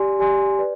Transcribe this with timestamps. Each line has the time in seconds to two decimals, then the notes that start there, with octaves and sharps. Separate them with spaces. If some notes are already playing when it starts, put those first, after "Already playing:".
Already playing: G4 D5 G#5 C6
0.19 G4 D5 G#5 C6
0.59 B4 D5